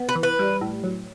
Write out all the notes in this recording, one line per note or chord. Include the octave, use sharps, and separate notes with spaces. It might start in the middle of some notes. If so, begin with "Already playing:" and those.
Already playing: B3
B4
E3
B4
G3
A2
F#3